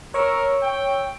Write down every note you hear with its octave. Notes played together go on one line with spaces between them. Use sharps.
A#4 C#5 C#6 E6
G5